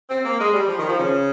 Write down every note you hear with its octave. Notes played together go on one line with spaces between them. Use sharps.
C4
A#3
G#3
G3
F3
D#3
F3
C#3